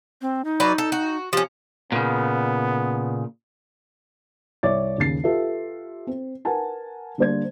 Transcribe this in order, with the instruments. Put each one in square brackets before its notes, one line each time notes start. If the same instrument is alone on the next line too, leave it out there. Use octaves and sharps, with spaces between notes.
[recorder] C4
D#4
[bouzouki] F#3 B4 D5
A4
F#4
[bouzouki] F3 C#4 [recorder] G4
[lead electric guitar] A#2 C#3 [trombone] B3
[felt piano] C2 C#5 D5 E5 D6 A6
D#1 D#2 C#3 A6 C7
F4 G4 A4 B4 E5
C4
A#4 B4 F#5 G#5 A5
D3 G3 A#3 C5 D5 G#6